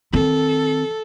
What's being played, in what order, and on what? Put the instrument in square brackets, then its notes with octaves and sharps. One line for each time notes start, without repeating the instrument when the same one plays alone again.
[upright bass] D#3 C4 [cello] A4